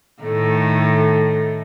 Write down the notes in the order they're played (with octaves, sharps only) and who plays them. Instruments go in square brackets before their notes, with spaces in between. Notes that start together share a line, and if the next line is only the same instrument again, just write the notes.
[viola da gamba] A2 D#3 A3